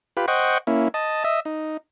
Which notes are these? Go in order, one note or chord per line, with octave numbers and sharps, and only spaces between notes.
F4 G4 B4
C5 D#5 F#5 G5 C#6
A#3 C#4 E4
D#5 A5
D#5 E5
D#4